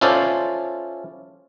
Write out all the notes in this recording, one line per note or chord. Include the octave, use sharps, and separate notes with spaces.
C#4 E4 F4 A4 C5 D5